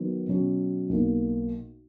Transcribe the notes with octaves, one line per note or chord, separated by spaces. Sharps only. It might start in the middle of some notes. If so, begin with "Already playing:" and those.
Already playing: D#3 F#3 B3
B2 F#3 C#4
B1 B2 A#3